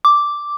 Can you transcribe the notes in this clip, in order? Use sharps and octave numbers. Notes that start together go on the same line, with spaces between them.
D6